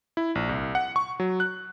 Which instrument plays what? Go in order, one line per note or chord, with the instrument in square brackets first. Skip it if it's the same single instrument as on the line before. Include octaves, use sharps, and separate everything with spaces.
[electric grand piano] E4
A#1
C2
F#5
C#6
F#3
F#6